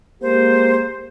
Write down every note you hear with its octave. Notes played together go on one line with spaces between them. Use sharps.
G#3 A#3 G4 C5